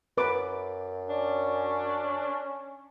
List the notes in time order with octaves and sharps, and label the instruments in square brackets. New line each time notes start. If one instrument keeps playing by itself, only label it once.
[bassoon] F#2 [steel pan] B4 D6
[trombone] C#4 [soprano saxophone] D4